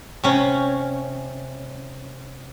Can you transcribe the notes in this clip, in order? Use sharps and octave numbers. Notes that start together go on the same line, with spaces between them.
C3 C#4